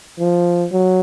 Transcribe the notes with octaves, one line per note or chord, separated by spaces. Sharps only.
F3
F#3